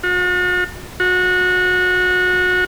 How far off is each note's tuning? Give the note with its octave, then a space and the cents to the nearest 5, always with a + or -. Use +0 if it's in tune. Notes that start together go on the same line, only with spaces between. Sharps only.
F#4 -45
F#4 -25